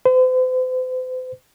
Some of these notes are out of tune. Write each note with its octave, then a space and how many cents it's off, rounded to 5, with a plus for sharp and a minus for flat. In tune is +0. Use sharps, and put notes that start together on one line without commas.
C5 -40